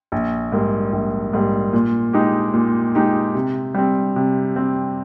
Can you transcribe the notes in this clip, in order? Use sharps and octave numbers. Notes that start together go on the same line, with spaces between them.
A#1
G#2 G3 A#3
A#1
G#2 G3 A#3
A#2
G#3 D#4 G4
A#2
G#3 D#4 G4
C3
G3 C4
C3
G3 C4